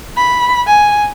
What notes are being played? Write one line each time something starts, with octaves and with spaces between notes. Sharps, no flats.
B5
G#5